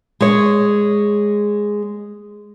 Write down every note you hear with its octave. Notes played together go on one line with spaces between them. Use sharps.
G#3 C#5